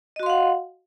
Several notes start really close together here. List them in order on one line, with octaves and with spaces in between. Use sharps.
D#5 F#4 C6 F5 F#5